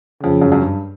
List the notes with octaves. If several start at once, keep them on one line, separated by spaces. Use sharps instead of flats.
F2 C#3
F#2
F#2
G2